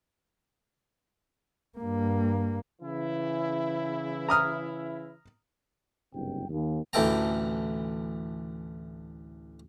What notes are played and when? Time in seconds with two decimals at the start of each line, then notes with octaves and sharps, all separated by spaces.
1.78 G2 A#3
2.82 C#3 E3 E4
4.28 A#5 D#6 F6
6.13 F#1 C2 G2 C4 G5
6.49 D#2
6.93 A1 D2 E3 A4 G5 A#5